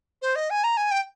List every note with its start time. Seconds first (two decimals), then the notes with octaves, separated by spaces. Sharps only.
0.22 C5
0.36 D#5
0.50 G#5
0.64 A#5
0.77 G#5
0.91 G5